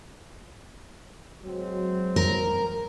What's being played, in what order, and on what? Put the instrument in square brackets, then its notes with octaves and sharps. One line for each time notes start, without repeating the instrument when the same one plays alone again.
[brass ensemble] F#3 G#3 C4
[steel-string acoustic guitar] A#4